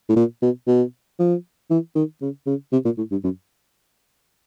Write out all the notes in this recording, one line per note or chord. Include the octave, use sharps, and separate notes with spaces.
A2
A#2
B2
B2
F3
E3
D#3
C#3
C#3
C3
A#2
A2
G2
F#2